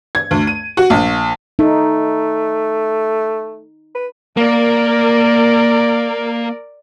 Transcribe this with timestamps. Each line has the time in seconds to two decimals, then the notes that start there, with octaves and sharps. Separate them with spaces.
0.15 G#6
0.31 D2
0.47 D#7
0.77 F#4
0.90 A#1
1.59 A3 D#4
3.95 B4
4.37 A#3 A#4 D5